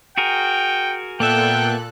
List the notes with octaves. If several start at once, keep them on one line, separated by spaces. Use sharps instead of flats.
F#4 G#4 A#4 G5
A#2 A#3 B3 A4 E5 G5 F#6